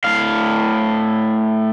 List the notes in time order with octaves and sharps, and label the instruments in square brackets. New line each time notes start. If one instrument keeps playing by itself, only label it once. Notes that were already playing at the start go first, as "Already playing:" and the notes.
[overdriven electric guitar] A2 F5